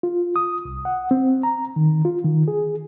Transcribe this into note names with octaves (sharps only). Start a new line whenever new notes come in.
F4
D#6
C2
F#5
C4
A#5
D#3
F4
D#3
G#4